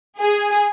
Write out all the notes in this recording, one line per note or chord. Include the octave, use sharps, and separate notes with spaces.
G#4